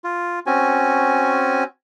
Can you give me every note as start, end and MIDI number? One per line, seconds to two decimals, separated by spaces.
0.04 0.39 65
0.46 1.64 60
0.46 1.64 61
0.46 1.64 66
0.46 1.64 80